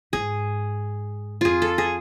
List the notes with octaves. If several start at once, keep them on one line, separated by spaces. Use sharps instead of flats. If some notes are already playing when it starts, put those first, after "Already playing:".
G#2 G#4
F2 F4 G#4
A4
G#4